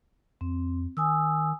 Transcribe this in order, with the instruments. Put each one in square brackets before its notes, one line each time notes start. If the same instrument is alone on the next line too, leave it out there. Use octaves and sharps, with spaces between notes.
[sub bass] F2 [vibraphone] C4
[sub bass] D#3 [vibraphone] G#5 D#6 E6